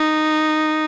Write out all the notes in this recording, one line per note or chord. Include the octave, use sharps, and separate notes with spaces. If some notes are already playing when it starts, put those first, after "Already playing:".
Already playing: D#4